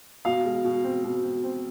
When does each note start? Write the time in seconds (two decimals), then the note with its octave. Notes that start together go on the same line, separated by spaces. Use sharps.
0.25 B2 F5
0.45 G#3
0.65 B2
0.84 C4
1.04 B2
1.23 C4
1.44 C4